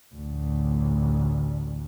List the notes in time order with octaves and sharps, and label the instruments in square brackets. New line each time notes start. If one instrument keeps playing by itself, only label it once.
[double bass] A1 D2